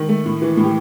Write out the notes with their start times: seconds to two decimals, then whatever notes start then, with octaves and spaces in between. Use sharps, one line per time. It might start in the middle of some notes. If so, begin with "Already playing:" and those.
Already playing: D#3
0.09 A3
0.26 A2
0.42 E3
0.57 A2
0.63 G4